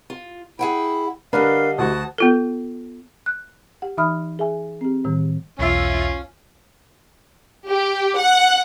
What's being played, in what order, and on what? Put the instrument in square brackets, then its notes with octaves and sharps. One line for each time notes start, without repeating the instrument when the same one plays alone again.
[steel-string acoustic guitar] F4
[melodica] E4 [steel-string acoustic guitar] G#4 F#5 G5
[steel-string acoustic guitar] D3 G3 D#5 [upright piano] D4 A#4 B4 [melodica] F5
[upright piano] D2 F#4 [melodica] A5 D#6
[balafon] B3 F4 A4
[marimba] F#6
G4 F#5
E3 D#4 E5 B5 D#6 F6
G#4 E5 G#5
C4 G4
A2 D#3 G3
[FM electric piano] B1 E2 E5 [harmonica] C#4 [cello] F4
[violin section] G4
F#5